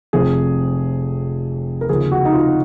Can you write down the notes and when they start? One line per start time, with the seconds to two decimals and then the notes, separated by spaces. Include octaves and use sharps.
0.13 F1 F2 F3 G#4
1.81 A#4
1.89 D#2 C#3 F3 G#4
2.11 F#4
2.25 D#4
2.33 F4